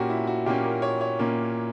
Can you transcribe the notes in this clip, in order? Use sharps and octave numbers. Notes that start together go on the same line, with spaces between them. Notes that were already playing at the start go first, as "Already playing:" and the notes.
Already playing: A#2 A#3 C#4 F#4 G4
E4
F#4
A#2 A#3 C#4 G4
A#4
C#5
C#5
A#2 A#3 C#4